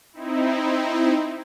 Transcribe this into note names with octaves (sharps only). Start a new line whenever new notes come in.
C4 D#4 E4